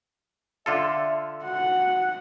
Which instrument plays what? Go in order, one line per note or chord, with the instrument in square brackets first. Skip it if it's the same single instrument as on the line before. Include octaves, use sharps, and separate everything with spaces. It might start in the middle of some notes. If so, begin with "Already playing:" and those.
[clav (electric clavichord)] D3 F4 A4 [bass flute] E5
[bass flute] F#4 [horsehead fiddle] F#5